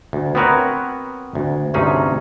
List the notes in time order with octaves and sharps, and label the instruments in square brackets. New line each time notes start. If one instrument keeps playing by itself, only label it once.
[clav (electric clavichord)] D2
B3 C4 F#4 A#4 B4 C#5
D2
D2 G2 C3 C#4 D#4 G#4